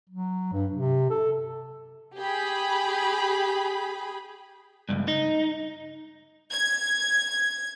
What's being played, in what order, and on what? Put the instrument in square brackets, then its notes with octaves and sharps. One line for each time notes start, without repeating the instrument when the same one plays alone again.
[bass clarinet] F#3
G2
C3
A4
[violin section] G4 G#4 B5
[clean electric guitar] C#2 G2
D#4
[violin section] G#6